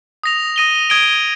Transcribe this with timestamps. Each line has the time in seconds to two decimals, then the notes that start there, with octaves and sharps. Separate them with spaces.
0.23 D#6 A#6 F7
0.56 D#6 A#6 D#7 G7
0.90 D#6 G#6 D7 G7